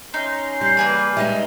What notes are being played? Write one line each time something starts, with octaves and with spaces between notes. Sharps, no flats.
C#4 D#4 C6
G3 G6 C7
G2 C#3 E3 A#3 G#4 B4
G3 G#3 D#4 E5